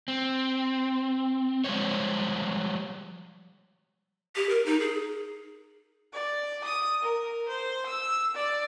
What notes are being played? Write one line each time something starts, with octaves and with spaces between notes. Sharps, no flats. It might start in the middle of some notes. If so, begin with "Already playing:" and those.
C4
F3 G3 G#3 C5 C#5
G4
A#4
D#4
G#4
D5
D#6
A#4
C5
E6
D5